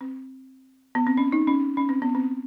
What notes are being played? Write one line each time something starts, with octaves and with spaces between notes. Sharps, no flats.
C4
B3
C4
C#4
D#4
C#4
C#4
C4
B3
C4